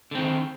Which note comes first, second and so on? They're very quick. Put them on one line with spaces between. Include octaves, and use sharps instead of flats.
D3 C4 D#3